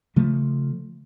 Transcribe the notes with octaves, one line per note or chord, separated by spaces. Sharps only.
C#3 F3 A3